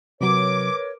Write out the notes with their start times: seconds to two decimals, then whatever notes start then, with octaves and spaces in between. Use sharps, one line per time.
0.21 C3 F#3 A#4 B4 C#5 D6